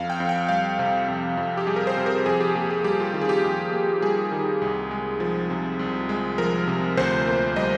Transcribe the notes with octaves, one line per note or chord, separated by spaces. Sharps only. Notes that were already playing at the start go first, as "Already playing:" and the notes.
Already playing: F2 F5
G5
F2
G5
G3 F5
C3
F2
F2
G4
G3 G#4
A#4
C5
C3
A#4
F2 G#4
G4
A#3 G4
G#4
G3 G4
F4
D#3 F4
G#4
G4
F2
A#3
G3 G#4
D#3
C2
G#3
F3
C3
C2
G#3
F3 A#4
C3
D2 C5
A#3
G3 D#5